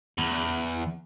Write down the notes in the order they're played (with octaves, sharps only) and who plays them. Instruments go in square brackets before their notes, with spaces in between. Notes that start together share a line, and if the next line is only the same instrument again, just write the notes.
[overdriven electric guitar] E2